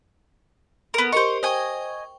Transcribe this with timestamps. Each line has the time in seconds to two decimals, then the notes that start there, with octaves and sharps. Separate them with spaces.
0.94 B3 A#4
1.12 G4 A#4 C5 D#5 C#6
1.43 C5 D#5 G5 G#5 C#6